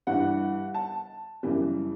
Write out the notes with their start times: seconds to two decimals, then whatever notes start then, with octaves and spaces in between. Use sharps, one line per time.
0.07 G2 E3 G3 F#5
0.74 A5
1.43 F#2 C#3 E3 G3